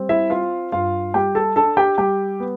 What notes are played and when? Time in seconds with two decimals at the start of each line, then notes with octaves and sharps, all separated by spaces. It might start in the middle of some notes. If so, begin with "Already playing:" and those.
Already playing: G3 C4
0.09 E4 E5
0.30 C4 F4 F5
0.72 G2 F4 F5
1.14 G3 G4 G5
1.35 A4 A5
1.56 D4 A4 A5
1.77 G4 G5
1.98 G3 G4 G5
2.40 B3